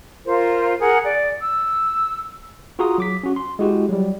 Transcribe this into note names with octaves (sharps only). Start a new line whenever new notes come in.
F4 A#4 C5
G#4 A#4 F#5
D5
E6
F4 F#4 G#4 A#5 C6 D#6
F#3 D6 B6
C#4 F#4
C6
G#3 E4 F#4 G4
F#3 G3